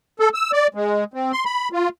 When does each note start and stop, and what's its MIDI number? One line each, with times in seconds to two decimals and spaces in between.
0.20 0.29 69
0.34 0.51 88
0.53 0.67 74
0.74 1.04 56
1.14 1.32 60
1.32 1.44 84
1.45 1.69 83
1.72 1.89 65